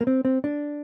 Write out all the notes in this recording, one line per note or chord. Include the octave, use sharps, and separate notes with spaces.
A#3
C4
C4
D4